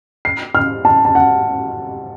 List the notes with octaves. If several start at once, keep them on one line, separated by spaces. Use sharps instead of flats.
C7
F6
A5
A5
F#5